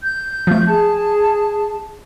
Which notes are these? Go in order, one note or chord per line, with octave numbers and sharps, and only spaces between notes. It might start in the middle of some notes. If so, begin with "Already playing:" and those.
G6
F3 A3
G#4 A5